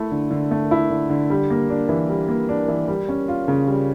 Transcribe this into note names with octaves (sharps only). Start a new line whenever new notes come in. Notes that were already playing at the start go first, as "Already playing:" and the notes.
Already playing: A3 E4
D3
D3
A3
E4
D3
D3
G3
A#3
D4
E3
G3
A#3
D4
E3
G3
C#4
F4
C#3
G3